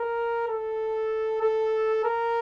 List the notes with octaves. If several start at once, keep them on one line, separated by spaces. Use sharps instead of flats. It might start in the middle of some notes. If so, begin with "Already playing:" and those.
Already playing: A#4
A4
A4
A#4